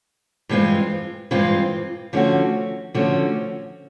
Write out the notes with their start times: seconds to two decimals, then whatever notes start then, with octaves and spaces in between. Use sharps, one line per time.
0.49 G2 E3 G#3 C4 F4
1.31 G2 E3 G#3 C4 F4
2.13 D3 F3 A3 C#4 F#4
2.94 D3 F3 A3 C#4 F#4